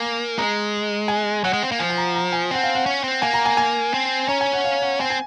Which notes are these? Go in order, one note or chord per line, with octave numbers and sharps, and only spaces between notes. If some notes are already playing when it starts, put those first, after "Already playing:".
Already playing: A#3 G#5
G#3 A#5
G#5
F#3 F#5
G#3
C4
A#3
F3 G#5
G#5
A#5
A#5
G#5
C4 F#5
F5
F#5
C#4
C4
A#3 G#5
A#5
G#5
G#5
C4
C#4 A#5
G#5
F#5
F5
F#5
C4 G#5
G#5